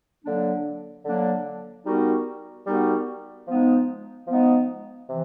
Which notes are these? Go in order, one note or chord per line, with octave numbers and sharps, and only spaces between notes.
D3 F#3 A#3 D4
D3 F#3 A#3 D4
G3 B3 D#4 F#4 A#4
G3 B3 D#4 F#4 A#4
F3 G#3 B3 D#4
F3 G#3 B3 D#4
C3 E3